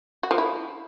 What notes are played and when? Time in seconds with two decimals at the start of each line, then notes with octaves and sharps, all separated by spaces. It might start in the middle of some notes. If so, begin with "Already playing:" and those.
0.23 F#4
0.31 F3
0.38 E4